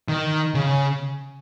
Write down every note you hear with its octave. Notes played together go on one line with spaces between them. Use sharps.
D#3
C#3